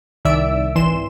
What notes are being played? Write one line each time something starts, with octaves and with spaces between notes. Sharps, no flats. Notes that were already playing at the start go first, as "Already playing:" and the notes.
C2 D#3 D5 E5 E6 D7
G#1 E3 C6 E7